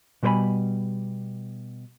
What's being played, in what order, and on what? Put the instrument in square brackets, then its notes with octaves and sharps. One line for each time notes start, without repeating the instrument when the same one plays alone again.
[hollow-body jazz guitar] B2 G3 A#4 C5 G#5 B5